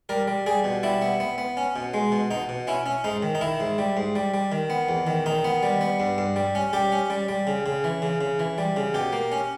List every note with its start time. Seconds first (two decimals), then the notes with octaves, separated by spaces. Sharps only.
0.09 G3 A#4
0.28 G3
0.46 G3 G#4
0.64 B2
0.83 G3 E4
1.02 B3
1.20 B3
1.38 B3
1.57 C#4
1.76 B2
1.94 G#3
2.12 B2
2.31 B2 D#4
2.49 B2
2.67 C#4 E4
2.86 C#4
3.04 G#2 D#4
3.22 D#3
3.35 D#4
3.41 D#3 E4
3.60 G#2
3.78 G3
3.97 G#2
4.15 G3
4.34 G3
4.52 D#3
4.70 B3
4.89 E2
5.07 D#3
5.26 D#3 D#4
5.44 B3
5.63 G3
5.81 B3
6.00 G2
6.18 G2
6.36 G3
6.55 C#4
6.73 G3 G4
6.92 C#4
7.10 G3
7.29 G3
7.47 C#3
7.66 C#3
7.84 E3
8.02 C#3
8.21 C#3
8.40 E3
8.58 G3
8.76 C#3
8.94 B2 G4
9.13 A#3
9.32 C#4